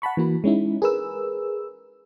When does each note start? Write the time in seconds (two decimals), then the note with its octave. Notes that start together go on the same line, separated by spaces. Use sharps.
0.02 F#5 A5 B5 C#6
0.17 E3 A#3 F#4 B5
0.44 G#3 C#4 D#4 E4
0.82 G#4 A#4 B4 E6